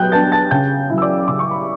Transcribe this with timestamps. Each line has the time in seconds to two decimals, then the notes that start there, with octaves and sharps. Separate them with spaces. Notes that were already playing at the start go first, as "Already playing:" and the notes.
Already playing: F#3 B3 G5 F#6 G6
0.12 B3 D4 A5 A6
0.32 A5 A6
0.51 C#3 G5 G6
0.90 F#3 C#4 E4
0.98 E6
1.02 D5 D6
1.28 C#3 D6
1.39 C#6
1.51 B5